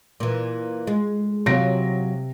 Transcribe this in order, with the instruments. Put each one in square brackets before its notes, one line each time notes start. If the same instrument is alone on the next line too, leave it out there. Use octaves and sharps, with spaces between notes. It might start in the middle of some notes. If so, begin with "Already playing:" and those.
[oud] A#2 E3
G#3
[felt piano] C3 A#6 D7 [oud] F#3 F4